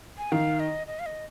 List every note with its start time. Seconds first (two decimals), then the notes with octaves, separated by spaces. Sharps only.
0.18 G#5
0.32 D#3 F5
0.60 D#5
0.87 D#5
0.99 F5
1.06 D#5